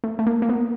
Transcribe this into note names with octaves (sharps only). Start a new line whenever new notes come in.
A3
A3
A#3
A#3
B3